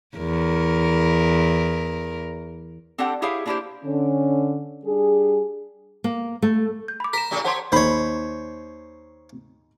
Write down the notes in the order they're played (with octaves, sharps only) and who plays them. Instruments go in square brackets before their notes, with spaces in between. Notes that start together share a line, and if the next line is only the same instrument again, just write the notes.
[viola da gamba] E2 A#4
[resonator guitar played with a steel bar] C4 D4 G4 A4 F#5
E4 G4 G#4 C#5 E5 F5
A#3 D4 E4 F4 G4 C5
[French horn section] D3 C#4
G3 D4 G#4
[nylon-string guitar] A#3
A3
[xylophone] G6
B5 D6
[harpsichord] A#4 [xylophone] B6 E7
[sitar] A2 C#3 G4
[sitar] G4 C5 C#5 [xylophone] F#5 A5 C6
[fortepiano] D#2 B5 [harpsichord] C5 C#5